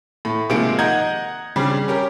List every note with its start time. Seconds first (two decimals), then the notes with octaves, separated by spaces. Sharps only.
0.25 A2
0.50 C3 D#3 F3 G#3 A#3 D7
0.79 D#5 F#5 A#5 G6 G#6
1.56 C#3 G3 C4 D4
1.88 C#4 G4 A#4